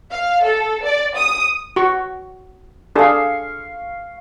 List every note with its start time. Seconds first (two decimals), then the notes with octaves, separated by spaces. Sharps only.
0.12 F5
0.45 A4
0.85 D5
1.16 D#6
1.76 F#4 C#6
2.96 D4 G#4 A4 F5 C#6